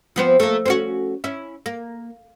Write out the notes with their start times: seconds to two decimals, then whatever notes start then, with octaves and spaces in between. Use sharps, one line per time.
0.16 F3 B3 C4
0.40 A3 A#3
0.66 C4 C#4 F#4
1.24 C#4 E4
1.66 A#3